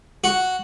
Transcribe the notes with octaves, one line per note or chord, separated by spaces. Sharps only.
F#4